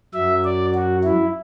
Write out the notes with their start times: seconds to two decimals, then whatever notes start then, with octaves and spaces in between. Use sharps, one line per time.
0.13 F#2 F#3 E5
0.44 D5
0.75 F#4
1.04 E4